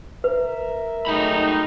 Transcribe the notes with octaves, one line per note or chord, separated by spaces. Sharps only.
A#4 B4 E5
F#3 G#3 A3 D#4 B5